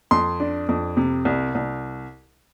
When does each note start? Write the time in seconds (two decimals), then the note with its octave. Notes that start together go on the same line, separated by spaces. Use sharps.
0.11 F2 C6
0.40 D4
0.69 F2
0.97 C3
1.25 C2
1.55 C2